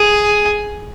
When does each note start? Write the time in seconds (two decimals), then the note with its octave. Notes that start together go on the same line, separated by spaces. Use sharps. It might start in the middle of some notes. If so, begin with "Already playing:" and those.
Already playing: G#4